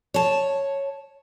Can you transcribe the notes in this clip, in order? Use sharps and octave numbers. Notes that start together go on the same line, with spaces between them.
C#5 A5